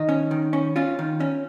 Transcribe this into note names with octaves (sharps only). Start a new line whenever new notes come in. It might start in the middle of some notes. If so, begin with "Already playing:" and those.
Already playing: D#3 D#4
C#4
D#3
C#4
C#4 F4
D#3
C#4